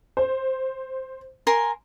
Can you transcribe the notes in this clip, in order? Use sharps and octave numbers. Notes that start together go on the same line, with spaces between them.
C5
A#4 G#5 C6